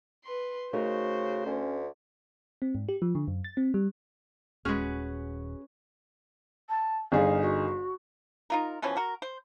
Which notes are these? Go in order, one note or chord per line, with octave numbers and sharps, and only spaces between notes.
B4 C6
C#3 A3 D#4 F#4 A#4 C5
D2 C#4
C4
G#2
G4
F3
D3
F#2
A6
C4
G3
D#1 G#3 C#4 F#4 G#4 B4 F6
A5
G1 D#4 G#4 F5
F#4
D#4 F4 A#4
B2 E3 F3 C#4
F#4 A#4
C5